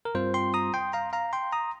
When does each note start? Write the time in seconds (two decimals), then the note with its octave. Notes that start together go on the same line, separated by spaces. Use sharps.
0.05 A#4
0.14 G2 G3 C4 F4 C5
0.34 G5 C6
0.54 A#5 D#6
0.74 G5 C6
0.93 F5 A#5
1.13 F5 A#5
1.33 G5 C6
1.52 A#5 D#6